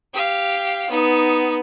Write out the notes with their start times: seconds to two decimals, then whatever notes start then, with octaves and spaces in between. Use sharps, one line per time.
0.14 G4 F5
0.90 B3 D#4